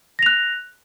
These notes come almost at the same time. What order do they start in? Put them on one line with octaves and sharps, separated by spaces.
A#6 F7 F#6